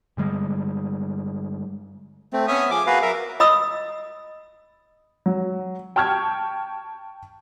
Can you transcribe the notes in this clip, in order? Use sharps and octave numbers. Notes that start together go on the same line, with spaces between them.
G2 D3 G3 G#3
A3 C4
B3 C#4 E5 D#6
F3 G#4 D6
A#3 F#4 G#4 B4 F5
F#3 A#4 E5
D#5 B5 D#6 E6
F#3
G5 A5 C#6 F6 G6 G#6